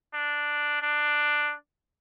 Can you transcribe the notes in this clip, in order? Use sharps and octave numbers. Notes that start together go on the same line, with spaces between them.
D4
D4